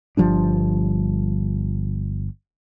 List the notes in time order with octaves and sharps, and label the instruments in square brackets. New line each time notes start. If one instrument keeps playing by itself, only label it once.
[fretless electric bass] G1 F3 G3 D4